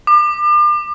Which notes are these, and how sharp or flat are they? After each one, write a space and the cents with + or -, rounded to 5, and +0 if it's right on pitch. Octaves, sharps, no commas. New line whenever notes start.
D6 +35